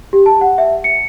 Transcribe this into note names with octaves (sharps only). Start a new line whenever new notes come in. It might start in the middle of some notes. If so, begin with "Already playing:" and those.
G4
A5
F#5
E5
C#7